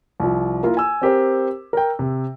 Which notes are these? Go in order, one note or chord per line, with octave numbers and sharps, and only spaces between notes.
C2 F3
A#3 E4 F4 A#4
G#5 E6
C4 G4 A#4 C5
A#4 G5
C3